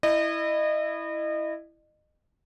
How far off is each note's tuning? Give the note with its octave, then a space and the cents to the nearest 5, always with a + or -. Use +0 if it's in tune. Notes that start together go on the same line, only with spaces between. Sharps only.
E4 +0 D#5 -30